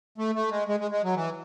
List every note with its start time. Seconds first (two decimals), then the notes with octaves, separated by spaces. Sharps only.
0.18 A3
0.35 A3
0.51 G#3
0.68 G#3
0.80 G#3
0.91 G#3
1.04 F#3
1.15 E3